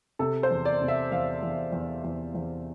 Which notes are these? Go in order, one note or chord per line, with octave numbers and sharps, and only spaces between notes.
C3 A4
C5
E2
D5
C3
E5
E2 F5
E2
E2
E2
E2